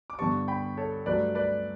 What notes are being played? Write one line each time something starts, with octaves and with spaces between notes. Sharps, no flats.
D6
G2 D3 G3 B3 A5 C#6
G5 B5
A4 C#5
G2 F#3 A3 B4 D5
B4 D5